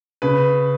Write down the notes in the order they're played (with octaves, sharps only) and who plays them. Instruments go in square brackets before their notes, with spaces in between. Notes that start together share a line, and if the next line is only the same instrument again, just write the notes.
[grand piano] C#3 B4